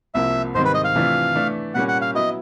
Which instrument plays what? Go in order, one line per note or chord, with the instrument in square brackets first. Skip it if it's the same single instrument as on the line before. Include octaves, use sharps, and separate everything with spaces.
[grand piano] C2 C3 F3 A#3 [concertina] E5
[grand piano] G#2 D#3 G3 C4 [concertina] C5
[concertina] B4
D#5
F5
[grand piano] C3 E3 A3 D4 F4
E3 A3 D4
[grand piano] A#2 G3 A#3 C#4 [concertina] F#5
[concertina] F#5
F5
[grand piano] F#3 B3 E4 [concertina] D#5